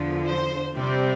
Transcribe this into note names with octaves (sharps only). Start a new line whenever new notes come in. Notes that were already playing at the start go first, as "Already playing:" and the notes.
Already playing: E2 D3 F3
C5
C3 G3 C4 D5